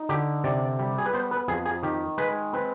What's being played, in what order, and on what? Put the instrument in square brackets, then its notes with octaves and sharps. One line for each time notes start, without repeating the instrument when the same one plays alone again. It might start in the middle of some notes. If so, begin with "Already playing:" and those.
Already playing: [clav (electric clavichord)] D#4
D3 G4
C3 D5
G3
G#4
B4
B3 C5
B4
F2 G#4
G#4
D#3 G4
G#3 B4
C4 B4